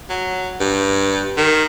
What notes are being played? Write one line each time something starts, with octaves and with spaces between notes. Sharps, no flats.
F#3
G2
D#3